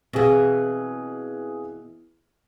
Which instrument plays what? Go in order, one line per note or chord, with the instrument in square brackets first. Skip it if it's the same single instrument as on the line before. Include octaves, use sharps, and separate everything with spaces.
[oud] B2 E3 [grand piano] C4 G#4 F5